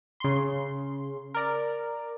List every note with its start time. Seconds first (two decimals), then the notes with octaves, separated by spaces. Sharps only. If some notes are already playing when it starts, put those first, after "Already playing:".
0.20 C#3 C6
1.34 A#4 D5